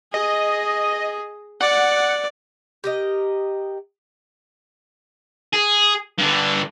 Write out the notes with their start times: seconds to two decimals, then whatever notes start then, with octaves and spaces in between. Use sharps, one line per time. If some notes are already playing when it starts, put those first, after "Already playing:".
0.14 G#4 D#5
1.61 D5 F#5
2.84 G4 A#4 D#5
5.54 G#4
6.19 G2 D3